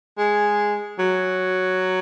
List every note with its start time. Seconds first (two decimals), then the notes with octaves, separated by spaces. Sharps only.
0.18 G#3
0.99 F#3